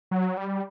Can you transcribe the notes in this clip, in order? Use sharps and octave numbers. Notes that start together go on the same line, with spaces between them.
F#3
G3